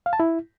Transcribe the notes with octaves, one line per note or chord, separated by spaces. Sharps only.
F5
A5
E4